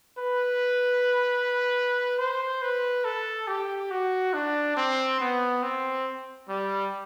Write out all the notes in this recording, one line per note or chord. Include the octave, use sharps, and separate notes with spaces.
B4
C5
B4
A4
G4
F#4
D4
C4
B3
C4
G3